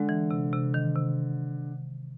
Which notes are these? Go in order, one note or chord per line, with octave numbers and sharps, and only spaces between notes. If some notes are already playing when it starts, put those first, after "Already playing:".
Already playing: D3 G#3
E3
C3
C3
D#3
C3